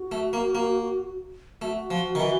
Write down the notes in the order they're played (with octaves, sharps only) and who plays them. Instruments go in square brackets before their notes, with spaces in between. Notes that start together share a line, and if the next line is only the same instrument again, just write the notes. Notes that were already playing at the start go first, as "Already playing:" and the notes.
Already playing: [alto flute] F#4
[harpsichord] A3
A#3
A#3
[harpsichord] A3 [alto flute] F#4
[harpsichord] F3
D#3
E3